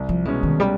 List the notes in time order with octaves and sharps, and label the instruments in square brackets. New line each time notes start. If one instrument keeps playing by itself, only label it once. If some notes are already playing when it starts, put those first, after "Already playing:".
Already playing: [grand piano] C2
[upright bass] F3
[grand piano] B2 G#3 C#4 [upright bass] E3
[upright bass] D#3
G3